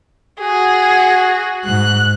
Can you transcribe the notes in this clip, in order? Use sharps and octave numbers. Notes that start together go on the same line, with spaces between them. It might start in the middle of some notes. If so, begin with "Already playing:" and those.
F#4 G#4
G#2 F#6